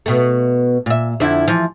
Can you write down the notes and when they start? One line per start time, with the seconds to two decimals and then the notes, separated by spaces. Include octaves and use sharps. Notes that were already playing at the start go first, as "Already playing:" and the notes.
0.06 B2 A3
0.86 A#2 E5
1.20 F2 D3 E4
1.48 E3 F3